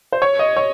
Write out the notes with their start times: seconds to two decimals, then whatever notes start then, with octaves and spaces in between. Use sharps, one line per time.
0.12 C5
0.22 C#5
0.39 D#5
0.57 C#5